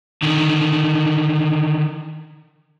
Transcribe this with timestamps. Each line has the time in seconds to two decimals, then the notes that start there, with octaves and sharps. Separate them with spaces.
0.22 D3 D#3